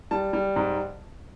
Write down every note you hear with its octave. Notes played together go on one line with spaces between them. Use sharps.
G3 A5
G3
G#2